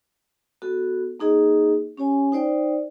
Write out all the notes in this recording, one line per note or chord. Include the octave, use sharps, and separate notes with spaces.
B3 F#4 A4
A#3 D#4 G#4 D#5
C#4 G4 C#5 G#5
D#4 C5 D5 G5